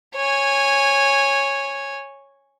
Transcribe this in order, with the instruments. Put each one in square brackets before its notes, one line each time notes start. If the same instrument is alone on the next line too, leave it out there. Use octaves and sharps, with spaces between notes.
[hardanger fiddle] C#5 G#5